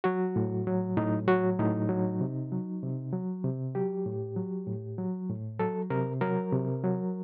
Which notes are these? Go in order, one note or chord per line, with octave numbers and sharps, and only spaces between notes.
F#3 F#4
A2
F#3
A2 D#4
F#3 F#4
A2 D#4
F#3
C3
F#3
C3
F#3
C3
F#3 G4
A2
F#3
A2
F#3
A2
F#3 A4
C3 A#4
F#3 A#4
C3
F#3